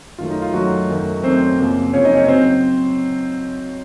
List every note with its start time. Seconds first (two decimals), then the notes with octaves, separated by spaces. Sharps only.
0.18 F#2 D#3 F#3 A3 F4
0.30 D#4
0.42 F4
0.53 F#2 D#3 F#3 A3 F#4
0.88 F#2 D#3 A3
1.23 F#2 D#3 A3 C4 C5
1.58 F#2 C#3 F3 A#3
1.93 F#2 C#3 F3 A#3 C#4 C#5
2.05 D#4 D#5
2.17 C#4 C#5
2.28 C#3 F#3 C4 C5